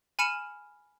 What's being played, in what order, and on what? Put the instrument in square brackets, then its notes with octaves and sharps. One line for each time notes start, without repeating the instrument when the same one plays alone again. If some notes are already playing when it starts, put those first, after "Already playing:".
[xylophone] G#5 B5 F6 C#7 D#7 E7